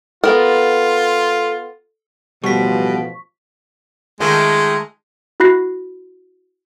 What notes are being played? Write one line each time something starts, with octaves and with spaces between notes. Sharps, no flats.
B3 F4 A4 A#4
A1 B2 F3 G3 C#6 B6
D#3 G#3 A3 F4
E4 F#4 B5 F#6 A#6 C7